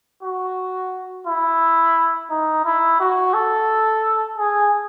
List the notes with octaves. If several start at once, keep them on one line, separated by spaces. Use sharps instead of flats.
F#4
E4
D#4
E4
F#4
A4
G#4